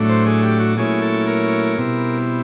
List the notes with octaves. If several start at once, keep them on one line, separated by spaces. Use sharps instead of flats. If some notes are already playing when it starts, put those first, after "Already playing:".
Already playing: A2 F#3 A3 D4
C5
G#4
G4
F#4
A#2 F#3 A3 C#4 E4 G#4
A4
A#4
B2 G3 C4 E4